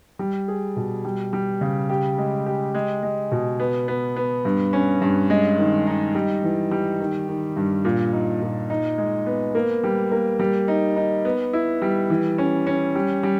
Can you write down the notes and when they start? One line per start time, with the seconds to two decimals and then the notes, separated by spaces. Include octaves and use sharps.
0.19 G3
0.48 G#4
0.76 B2
1.05 G3
1.33 G3
1.61 C#3
1.89 G4
2.18 G#3
2.46 G4
2.75 G#3
3.03 G#3
3.32 B2
3.60 B3
3.88 B3
4.16 B3
4.45 G2
4.73 C#4
5.01 G2
5.30 G#3
5.58 D#3
5.87 D#4
6.15 G3
6.43 E3
6.71 G3
7.00 D#3
7.28 D#3
7.56 G2
7.85 A#2
8.13 D#4
8.41 A#2
8.70 D#4
8.98 G#3
9.26 B3
9.55 A#3
9.84 G3
10.12 A#3
10.40 G3
10.68 D#4
10.96 D#4
11.25 B3
11.53 E4
11.82 G3
12.10 E3
12.38 C#4
12.67 C#4
12.95 G3
13.23 G3